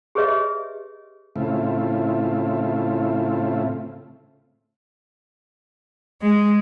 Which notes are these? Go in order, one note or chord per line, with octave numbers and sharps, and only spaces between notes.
G4 G#4 B4 C#5 D#5 E5
A2 C#3 A3 C4 E4 F4
G#3